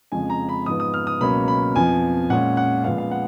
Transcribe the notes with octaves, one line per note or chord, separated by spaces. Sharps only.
F2 C#3 F3 G#3 G#5
A#5
B5
G#2 F3 B3 D#6
D#6
F6
D#6
C#2 B2 F#3 A#3 C#4 B5
B5
F2 F3 B3 G#5
A#2 G#3 C#4 F#5
F#5
A#2 F3 G#3 B3 F5
F5
F#5